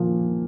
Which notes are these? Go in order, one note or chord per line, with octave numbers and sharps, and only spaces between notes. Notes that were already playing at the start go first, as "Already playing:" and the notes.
Already playing: A#2 F3 A#3